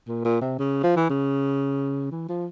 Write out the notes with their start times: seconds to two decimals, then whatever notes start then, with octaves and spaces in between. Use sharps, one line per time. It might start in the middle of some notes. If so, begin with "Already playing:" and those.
0.08 A#2
0.25 A#2
0.41 C3
0.59 C#3
0.83 F3
0.96 E3
1.10 C#3
2.11 E3
2.29 F3